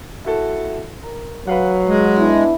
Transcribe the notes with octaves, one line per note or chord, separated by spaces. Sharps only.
E4 F#4 A4
A#4
F#3 B4 F5 F#5
G#3
B3 D4 E4